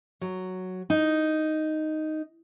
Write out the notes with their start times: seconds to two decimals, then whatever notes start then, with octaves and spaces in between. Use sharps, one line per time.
0.21 F#3
0.90 D#4